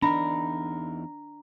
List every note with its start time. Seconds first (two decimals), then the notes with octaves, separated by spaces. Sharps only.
0.02 E2 D4 D#4 A#4 A#5 B5